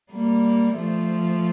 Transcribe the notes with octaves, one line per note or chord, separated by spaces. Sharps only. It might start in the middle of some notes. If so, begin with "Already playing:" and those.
G3 A#3
F3 A3